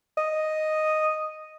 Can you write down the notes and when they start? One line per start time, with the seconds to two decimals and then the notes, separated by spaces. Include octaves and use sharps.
0.18 D#5